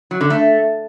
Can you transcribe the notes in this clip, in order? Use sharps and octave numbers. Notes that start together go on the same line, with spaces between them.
F#3
D3
A3